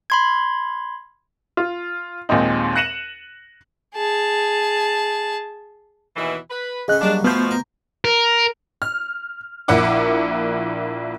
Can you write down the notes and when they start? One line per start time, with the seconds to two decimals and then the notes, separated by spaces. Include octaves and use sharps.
0.10 B5 C6 G#6
1.57 F4
2.29 D#2 A#2 G#3 C4 D#4
2.76 F#6 A#6 C#7 D#7 E7 F#7
3.95 G#4 A5
6.16 D#2 B2 E3
6.51 B4
6.88 C#3 B3 G#4 A4 D#5 F#6
7.01 F#3 G3 A#3 D4
7.24 B2 F3 A3 B3 F4 F#4 G6
7.51 A#4
8.05 A#4
8.82 F6
9.68 A#1 A#3 E4 F#5 D6